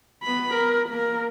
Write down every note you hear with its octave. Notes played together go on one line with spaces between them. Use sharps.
B3 B5
A#4
A#3 A#4